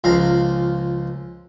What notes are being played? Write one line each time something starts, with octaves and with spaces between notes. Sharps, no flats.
C#2 F3 F5 A#5